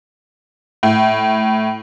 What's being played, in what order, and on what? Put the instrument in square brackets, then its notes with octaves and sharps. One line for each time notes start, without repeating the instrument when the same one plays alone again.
[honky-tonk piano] A2